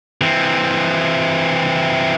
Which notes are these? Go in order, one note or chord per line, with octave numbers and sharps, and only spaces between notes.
E3 C4